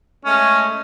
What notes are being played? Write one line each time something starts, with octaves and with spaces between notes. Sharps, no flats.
G#3 A3 C#4